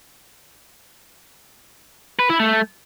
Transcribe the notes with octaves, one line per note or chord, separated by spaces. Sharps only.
B4
E4
A3